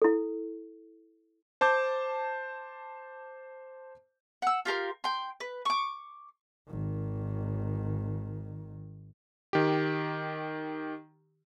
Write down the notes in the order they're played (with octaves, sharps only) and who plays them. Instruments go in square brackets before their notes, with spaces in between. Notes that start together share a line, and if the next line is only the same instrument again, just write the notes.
[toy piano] E4 A4
[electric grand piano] C5 A5 D6 G6
[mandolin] F#5 E6
F4 G4 A#4 C6
G5 C6
B4
C#6 D6
[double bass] G#1 D#3
[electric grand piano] D#3 G4